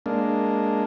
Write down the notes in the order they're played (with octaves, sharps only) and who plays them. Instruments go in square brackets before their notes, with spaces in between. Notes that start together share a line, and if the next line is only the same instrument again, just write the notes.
[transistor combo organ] G#3 A#3 D4